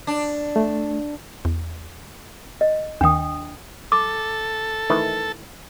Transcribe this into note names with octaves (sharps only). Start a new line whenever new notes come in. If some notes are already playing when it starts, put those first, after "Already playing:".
D4
A3
E2
D#5
D#2 D#3 D4 G5 D#6
A4 D6
D#3 E3 A3